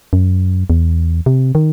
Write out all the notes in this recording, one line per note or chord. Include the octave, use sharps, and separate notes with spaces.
F#2
E2
C3
D#3